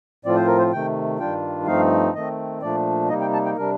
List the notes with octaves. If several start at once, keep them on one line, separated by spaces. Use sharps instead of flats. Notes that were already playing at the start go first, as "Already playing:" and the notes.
A2 F3 C4 F4 D5
C5
A#4
C5
C3 D#3 A3 G5
G2 D#3 G3 D4 F4 G5
G2 F3 A3 C4 D#4 F5
D#3 A3 C4 D#5
A#2 F3 A3 D4 D5
C3 G3 A#3 D#4 D#5
G5
A5
G5
C3 G3 D4 A#4